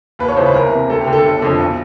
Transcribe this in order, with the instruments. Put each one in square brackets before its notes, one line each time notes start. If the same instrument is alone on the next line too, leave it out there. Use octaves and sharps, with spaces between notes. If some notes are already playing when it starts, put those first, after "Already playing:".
[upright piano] D#2 B4
C#5
C#3 E3 C5
B4
C2 A#4
C3 E3
D2 A4
G4
D3
A4
G1
F2 D3
B1